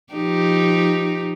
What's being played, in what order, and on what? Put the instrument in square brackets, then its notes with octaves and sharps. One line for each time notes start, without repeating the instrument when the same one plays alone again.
[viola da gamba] F3 D#4 G4